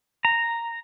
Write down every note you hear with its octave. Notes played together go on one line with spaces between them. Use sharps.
A#5